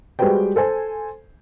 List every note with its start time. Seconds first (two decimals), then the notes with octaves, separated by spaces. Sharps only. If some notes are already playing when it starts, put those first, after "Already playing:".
0.19 G3 G#3 F#4 B4 C5 G5
0.56 A4 C5 G#5